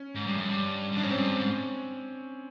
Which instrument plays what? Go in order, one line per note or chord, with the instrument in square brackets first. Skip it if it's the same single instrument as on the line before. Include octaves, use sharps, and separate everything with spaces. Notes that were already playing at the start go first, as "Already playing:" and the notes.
Already playing: [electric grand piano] C#4
[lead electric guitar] G#2
G2
F#2
G2
G2
[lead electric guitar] F#2 [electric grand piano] D4
[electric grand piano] C#4
[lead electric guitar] G#2 [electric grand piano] C4
[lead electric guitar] G2 [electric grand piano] C#4
[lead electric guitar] G#2